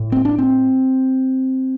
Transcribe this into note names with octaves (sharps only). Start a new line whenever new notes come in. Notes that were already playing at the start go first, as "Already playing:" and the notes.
Already playing: A2
C4
D4
C4